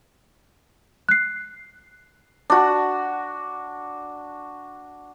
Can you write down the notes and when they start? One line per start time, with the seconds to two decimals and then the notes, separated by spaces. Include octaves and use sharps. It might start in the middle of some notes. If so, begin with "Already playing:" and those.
1.09 F#6 C7
2.50 D4 F#4